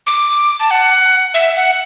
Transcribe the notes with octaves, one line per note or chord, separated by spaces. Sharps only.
D6
A5
F#5
E5
F#5